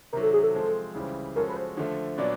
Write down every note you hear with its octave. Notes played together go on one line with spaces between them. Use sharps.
C3 D#3 F#3 A#4
A4
G#4
A4
F3 G#3 C4
C#2 C#3 E3 G3 C4
F3 G#3 C#4 F#4 A4 A#4
B4
C5
D3 F3 A3
A#2 F#3 B3 D4 D5